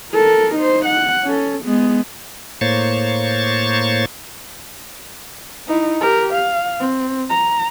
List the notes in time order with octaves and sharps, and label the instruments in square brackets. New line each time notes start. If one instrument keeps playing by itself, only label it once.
[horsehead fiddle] A4 A#4
D#4 C5
F#5
C#4 A4
G#3 B3
[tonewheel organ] A2 A#3 C5 C#5 C#6 A6
[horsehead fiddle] D#4 E4
G4 A#4
F5
C4
A#5